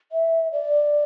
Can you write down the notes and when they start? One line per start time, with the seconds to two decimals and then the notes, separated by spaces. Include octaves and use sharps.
0.12 E5
0.52 D5